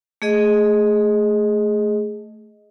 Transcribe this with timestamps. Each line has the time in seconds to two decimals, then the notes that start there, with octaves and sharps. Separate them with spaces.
0.22 A3 G#4 D#5